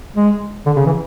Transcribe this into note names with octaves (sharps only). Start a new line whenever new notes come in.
G#3
D3
C#3
E3